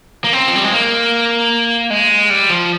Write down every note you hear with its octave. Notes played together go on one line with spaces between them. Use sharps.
A#3
C4
F3
G3
G#3
A#3
G#3
G3
F3